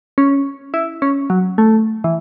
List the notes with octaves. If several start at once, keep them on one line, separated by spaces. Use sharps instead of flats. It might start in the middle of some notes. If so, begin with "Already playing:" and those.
C#4
E4
C#4
F#3
A3
E3